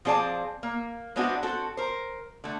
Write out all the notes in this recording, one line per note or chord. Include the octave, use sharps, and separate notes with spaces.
F3 C4 G#4 D5 A5
A#3
G#3 B3 C4 D4 E4 F#4
C4 F#4 A4
A#4 C5
D3 A3